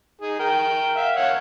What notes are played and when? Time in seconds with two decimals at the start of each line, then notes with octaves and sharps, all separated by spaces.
0.21 D#4 G#4
0.39 A#4 G5
0.96 E5 F5
1.17 C#5 F5 F#5